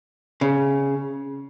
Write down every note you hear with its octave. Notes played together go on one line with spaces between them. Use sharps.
C#3